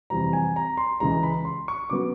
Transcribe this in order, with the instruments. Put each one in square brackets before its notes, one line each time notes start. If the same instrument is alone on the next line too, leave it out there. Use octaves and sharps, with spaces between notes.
[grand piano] F2 C3 E3 G3 C4 A#5
G#5
A#5
C6
C#2 C#3 E3 G#3 A#5
B5
C6
C#6
C#3 F#3 B3 D6